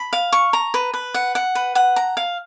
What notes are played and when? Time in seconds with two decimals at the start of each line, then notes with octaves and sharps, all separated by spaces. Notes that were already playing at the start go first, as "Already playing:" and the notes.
Already playing: B5
0.13 F5
0.33 C#6
0.53 A#5
0.74 B4
0.94 B4
1.14 F#5
1.35 F#5
1.55 B4
1.75 F#5
1.96 A#5
2.17 F5